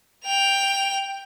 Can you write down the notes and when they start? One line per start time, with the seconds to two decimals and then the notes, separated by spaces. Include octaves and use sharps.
0.25 G5 F7